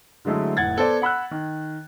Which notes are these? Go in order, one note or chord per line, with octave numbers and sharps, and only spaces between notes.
D3 F#3 G#3 A3 E4
F1 A2 F#5 G#6 A6
B3 A4 C5 D5
F#5 B5 E6 F#6
D#3